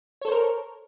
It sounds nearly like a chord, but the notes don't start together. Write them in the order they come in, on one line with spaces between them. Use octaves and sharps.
C#5 A4 C5 A#4